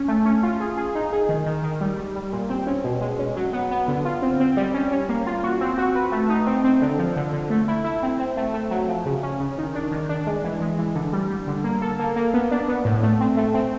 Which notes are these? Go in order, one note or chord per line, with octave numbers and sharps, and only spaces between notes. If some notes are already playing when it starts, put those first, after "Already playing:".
Already playing: C#4
A3
C#4
F4
G#4
G#4
D#4
G#4
D#3
D#3
D#3
G3
G3
G3
A#2
C4
C#4
B2
G#3
C#4
F#3
B3
B3
D3
F4
C4
C4
G3
C#4
C#4
A#3
F4
F#4
C4
F#4
B4
A3
D#4
C4
C4
D3
F3
D3
D3
A3
E4
E4
C4
C4
A3
A3
F#3
F3
C#3
C#4
C#3
D#3
D4
D#3
D4
G#3
E3
G#3
E3
D3
G3
G3
D3
A#3
A4
A#3
A#3
B3
D4
B3
A2
A3
C4
A3
C4